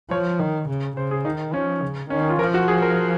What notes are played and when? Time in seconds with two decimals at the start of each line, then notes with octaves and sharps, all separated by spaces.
0.11 F3 C#5
0.40 D#3
0.69 C#3
0.97 C#3 C5
1.11 G#4
1.25 D#3 D#4
1.53 F3 C#4
1.82 C#3
2.10 D#3 C#4
2.20 C#4
2.29 F4
2.39 F3 A#4
2.54 F#4
2.68 G#4
2.82 A#4